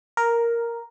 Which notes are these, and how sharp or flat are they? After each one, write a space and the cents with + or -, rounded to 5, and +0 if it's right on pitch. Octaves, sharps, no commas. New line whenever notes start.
A#4 +0